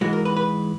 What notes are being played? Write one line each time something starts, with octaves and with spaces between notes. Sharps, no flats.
G#2 E3 G#3 F#4
A#4
B4
B4